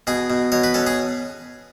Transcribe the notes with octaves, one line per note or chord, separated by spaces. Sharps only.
B2 G#4
B2
B2 C#5
B4
C#4 A4
G#4